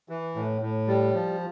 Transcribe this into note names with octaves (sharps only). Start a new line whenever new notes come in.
E3
A2
A2
G3
F3